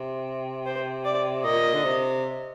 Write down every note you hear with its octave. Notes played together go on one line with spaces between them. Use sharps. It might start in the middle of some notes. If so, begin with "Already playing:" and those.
Already playing: C3
C5
D5
A#2 D#5
D3
C3